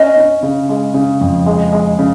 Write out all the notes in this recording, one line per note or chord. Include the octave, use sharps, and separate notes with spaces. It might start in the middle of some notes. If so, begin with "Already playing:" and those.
Already playing: C#4 D#5
C#4
C#3
G#3
C#3
F2
G#3
G#3
C#3